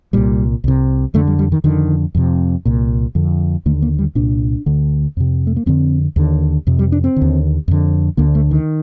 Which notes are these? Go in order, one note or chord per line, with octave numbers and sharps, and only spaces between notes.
C2 A#2 G3
C2 C3
F2 D3 A3
G3
G3
D#3
F2 D3 D#3
F2 C3
C2 A#2
F2 D3
D#2 D3 A3
A#3
G3
C2 A#2 D4
D2 D3
F2 C3
A3
A#3
F2 D3 C4
D#2 D3
F2 C3
G3
D4
C4
D3
D#2
F2 D3
D2 D3 A#3
A3
D#3